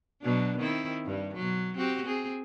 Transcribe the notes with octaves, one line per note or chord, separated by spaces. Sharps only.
B2 F#3 D4
D#3 C4 E4
G2 G3
B2 F#3
C4 F#4 G4
C4 G#4